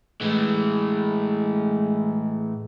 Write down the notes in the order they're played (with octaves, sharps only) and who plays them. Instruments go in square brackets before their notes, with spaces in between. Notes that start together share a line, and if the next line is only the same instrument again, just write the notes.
[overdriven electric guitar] A2 E3 [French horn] G#3